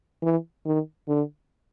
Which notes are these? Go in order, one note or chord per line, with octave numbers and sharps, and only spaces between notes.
E3
D#3
D3